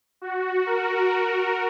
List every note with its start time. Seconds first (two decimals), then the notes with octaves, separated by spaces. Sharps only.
0.21 F#4
0.66 A#4